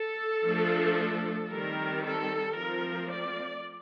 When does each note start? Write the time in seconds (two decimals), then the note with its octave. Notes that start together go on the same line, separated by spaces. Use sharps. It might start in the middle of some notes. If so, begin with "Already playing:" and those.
Already playing: A4
0.45 F3 A3 D4
1.50 D#3 G3 C4 A#4
2.03 A4
2.56 F3 A3 C4 A#4
3.09 D5